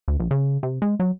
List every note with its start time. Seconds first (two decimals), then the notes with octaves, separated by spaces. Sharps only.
0.08 D2
0.20 A#1
0.31 C#3
0.63 C3
0.82 G#3
1.00 F#3